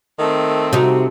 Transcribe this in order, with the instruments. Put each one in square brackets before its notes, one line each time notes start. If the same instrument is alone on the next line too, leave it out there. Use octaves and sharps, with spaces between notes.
[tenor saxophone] D#3 [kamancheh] A3 C4
[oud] C3 D#4 [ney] F#4